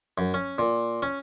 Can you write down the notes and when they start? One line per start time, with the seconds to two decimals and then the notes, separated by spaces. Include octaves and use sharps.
0.18 F#2
0.34 C#4
0.58 A#2
1.02 C#4